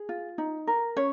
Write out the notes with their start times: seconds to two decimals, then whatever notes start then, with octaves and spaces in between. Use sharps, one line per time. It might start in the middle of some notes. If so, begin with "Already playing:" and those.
Already playing: G#4
0.09 F4
0.38 D#4
0.67 A#4
0.97 C#4 C#5